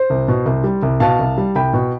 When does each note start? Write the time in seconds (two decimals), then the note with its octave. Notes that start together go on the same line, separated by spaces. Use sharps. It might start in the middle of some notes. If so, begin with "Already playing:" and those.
Already playing: C5
0.10 C2
0.28 B2
0.46 C2
0.64 G3
0.82 C2
1.00 B2 F5 A5
1.19 C2
1.38 G3
1.55 C2 G5 B5
1.73 B2